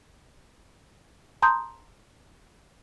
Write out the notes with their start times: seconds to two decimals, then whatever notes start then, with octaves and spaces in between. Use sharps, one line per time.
1.42 A5 A#5 C6 D#6 G6